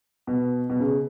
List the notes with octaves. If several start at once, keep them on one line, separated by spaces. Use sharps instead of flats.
B2
B2
C#3